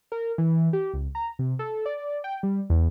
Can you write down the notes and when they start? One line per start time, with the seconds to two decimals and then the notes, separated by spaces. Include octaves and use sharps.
0.12 A#4
0.38 E3
0.73 G4
0.94 C#2
1.15 A#5
1.39 C3
1.59 A4
1.86 D5
2.24 G5
2.43 G3
2.70 E2